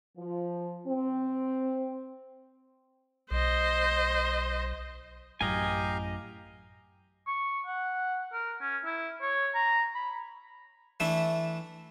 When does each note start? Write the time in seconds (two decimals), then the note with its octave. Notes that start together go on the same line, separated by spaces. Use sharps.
0.18 F3
0.87 C4
3.31 B1 C5 D#5
5.41 A1 F#2 G4 D#5 F5 G#5 A#5
7.27 C#6
7.66 F#5
8.32 A#4
8.61 C#4
8.85 E4
9.22 C#5
9.55 A#5
9.95 B5
11.00 E3 A3 D4 E4